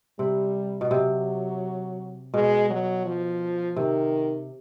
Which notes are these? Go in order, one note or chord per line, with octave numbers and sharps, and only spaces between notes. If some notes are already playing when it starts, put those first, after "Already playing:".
C3 G3
B2
C3 F#3
B2 G#3
F#3
F3
C3 D#3